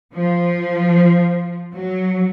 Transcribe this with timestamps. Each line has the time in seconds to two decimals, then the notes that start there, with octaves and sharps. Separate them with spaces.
0.14 F3
1.74 F#3